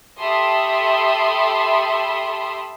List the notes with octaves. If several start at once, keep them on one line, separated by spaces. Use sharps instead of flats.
G4 A4 E5 B5 C6 D#6